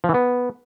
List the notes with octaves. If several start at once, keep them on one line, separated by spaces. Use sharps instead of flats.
F3
E3
B3